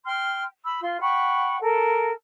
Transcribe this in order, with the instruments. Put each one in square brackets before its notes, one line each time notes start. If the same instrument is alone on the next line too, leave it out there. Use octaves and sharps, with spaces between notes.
[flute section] G5 C6 F6
B5 E6
F4 C6
F#5 G5 B5 C#6
A4 A#4